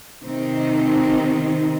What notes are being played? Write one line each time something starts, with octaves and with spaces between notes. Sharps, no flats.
C3 D#3 C4 D#4